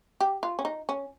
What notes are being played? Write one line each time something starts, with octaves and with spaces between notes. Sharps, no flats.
G4
F4
C#4
D#4
C#4